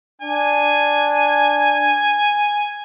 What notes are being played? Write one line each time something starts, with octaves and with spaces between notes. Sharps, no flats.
D4 G#5